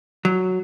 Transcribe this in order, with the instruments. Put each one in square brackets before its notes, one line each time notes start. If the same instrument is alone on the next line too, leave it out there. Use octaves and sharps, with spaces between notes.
[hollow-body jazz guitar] F#3